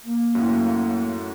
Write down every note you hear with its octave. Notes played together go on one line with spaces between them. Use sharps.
A#3
F#2 A2